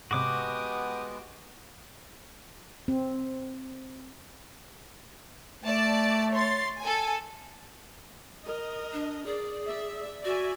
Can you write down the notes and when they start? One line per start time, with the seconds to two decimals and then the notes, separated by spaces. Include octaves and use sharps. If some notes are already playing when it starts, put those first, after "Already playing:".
0.11 G#2 C3 G#3 B3 F#4 G4 D6 D#6
2.88 C4
5.64 A3 D5 A5
6.33 C#5 C6 A6
6.80 A4 G#5
8.45 A#4 D#5
8.93 D4
9.26 G#4 D5
9.66 D5 E5
10.25 F#4 D5 E5 G#5